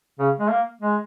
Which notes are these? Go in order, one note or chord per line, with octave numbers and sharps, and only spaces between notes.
C#3
G#3
A#3
G#3